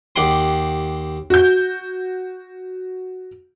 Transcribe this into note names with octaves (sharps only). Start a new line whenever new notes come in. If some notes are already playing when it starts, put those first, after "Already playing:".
D#2 G4 F#5 G5 C6
F#4 G6